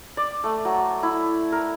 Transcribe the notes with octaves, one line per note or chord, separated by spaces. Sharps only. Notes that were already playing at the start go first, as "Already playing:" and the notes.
D5
A3
F#3
E4
A#4